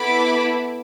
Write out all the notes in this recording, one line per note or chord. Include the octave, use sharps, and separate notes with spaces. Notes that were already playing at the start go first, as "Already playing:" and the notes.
Already playing: B3 E4 A4 B5 D6